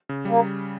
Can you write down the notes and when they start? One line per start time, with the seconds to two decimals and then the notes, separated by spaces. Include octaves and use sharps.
0.09 C#3
0.25 G3 A#3